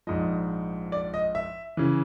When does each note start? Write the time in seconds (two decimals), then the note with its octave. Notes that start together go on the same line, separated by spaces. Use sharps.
0.07 A#1 G#2 F3 D#5
0.92 D5
1.14 D#5
1.35 E5
1.77 C#3 E3